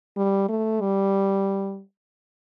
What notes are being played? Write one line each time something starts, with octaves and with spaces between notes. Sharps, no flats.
G3
A3
G3